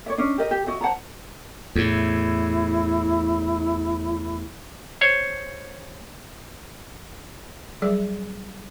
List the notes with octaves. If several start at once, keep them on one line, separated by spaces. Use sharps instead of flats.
C#5 D5 E5
C#4 D4 D#5
G4 A#4 D#5
G4
F#4 D#5 E5
C5 F#5 A5 A#5
E2 A2 E4
C5 C#5
F#3 G3 G#4 D5